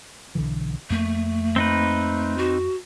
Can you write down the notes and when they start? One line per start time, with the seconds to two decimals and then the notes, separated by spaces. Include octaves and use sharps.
0.35 B1 D3 E3
0.90 F2 A3 A#3
1.56 C4 D#4 B4
2.38 F#4